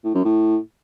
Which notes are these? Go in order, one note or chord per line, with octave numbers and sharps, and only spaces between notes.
A2
F#2
A2